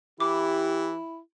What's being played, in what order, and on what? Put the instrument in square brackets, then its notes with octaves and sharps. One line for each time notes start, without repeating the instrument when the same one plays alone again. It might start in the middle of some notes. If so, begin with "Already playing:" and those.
[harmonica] E3 [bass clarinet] E4 [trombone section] G4 [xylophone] D6